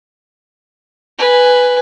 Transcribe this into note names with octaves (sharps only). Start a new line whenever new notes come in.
B4 G#5